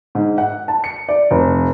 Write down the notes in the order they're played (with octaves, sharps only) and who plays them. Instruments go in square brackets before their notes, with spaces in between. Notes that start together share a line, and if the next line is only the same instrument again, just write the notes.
[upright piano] G#2
F#5
A5
C#7
D5
F1